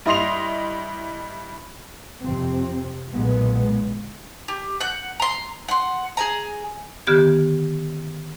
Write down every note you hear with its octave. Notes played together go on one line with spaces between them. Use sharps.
G2 E4 D#5 C6 C7 F7
F2 C3 C4
B1 A#2 D3 G#3 B3
G4
F#5 F#6 G6
A#5 C6
F#5 C6
G#4 G#5 A#5
D3 D#3 B3 G4 F6 G#6